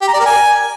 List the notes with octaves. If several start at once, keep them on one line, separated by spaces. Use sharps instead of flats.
G4
A#5
D5
A#4
G#5